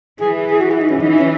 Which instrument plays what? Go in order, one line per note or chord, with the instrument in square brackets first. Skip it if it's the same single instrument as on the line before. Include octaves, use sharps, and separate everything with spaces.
[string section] E3 [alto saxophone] G#4
[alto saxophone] G#4
F#4
E4
D#4
C#4
[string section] E3 [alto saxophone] D#4
[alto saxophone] D#4
C#4